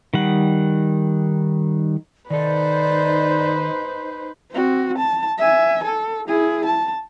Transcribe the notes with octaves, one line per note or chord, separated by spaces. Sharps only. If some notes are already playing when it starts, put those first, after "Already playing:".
D#3 G3 F#5
D#3 D#4 A4 B4 C5 D5
C4 F#4
A5
E5 G#5
A4
E4 G#4
A5